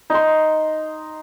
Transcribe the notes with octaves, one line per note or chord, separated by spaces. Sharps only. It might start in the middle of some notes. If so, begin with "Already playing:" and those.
D#4 C6